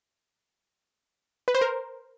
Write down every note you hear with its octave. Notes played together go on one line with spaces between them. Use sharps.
B4
C5
A#4